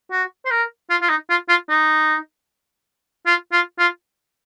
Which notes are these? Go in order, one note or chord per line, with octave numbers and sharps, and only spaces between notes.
F#4
C5
A#4
F4
F4
D#4
F4
F4
D#4
F4
F4
F4